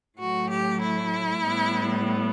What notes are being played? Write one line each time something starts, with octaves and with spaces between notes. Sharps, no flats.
A2 F#3 A3 F#4
G4
E4
A2 G3 B3